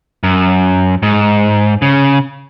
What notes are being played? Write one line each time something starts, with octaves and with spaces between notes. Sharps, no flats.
F#2
G#2
C#3